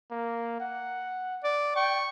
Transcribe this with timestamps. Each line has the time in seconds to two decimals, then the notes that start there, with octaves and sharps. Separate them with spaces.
0.11 A#3
0.60 F#5
1.44 D5
1.76 G5 C#6